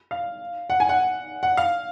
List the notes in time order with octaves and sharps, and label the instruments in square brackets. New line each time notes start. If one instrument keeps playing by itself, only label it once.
[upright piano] F5
F#5
G#5
F#5
F#5
F5